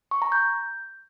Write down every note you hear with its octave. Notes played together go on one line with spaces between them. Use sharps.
C#6
A#5
G6